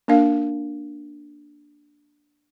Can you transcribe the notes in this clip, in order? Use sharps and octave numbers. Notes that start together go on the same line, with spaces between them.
A#3 D4 A#4 F5